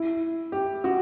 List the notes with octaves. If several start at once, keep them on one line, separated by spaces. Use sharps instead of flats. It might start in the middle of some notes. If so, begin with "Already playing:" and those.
Already playing: E4
G4
F#4